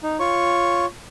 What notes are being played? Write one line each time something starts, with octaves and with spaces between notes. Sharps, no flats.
D#4
F4 C#5 C#6